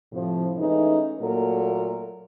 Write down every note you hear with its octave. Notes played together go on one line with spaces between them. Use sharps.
A2 C3 F3
E3 G#3 A3 C#4 D#4 E4
A#2 F#3 A3 A#3 A4 A#4